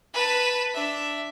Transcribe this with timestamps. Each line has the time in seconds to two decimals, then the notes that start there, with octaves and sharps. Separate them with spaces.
0.14 B4 A5
0.74 D4 E5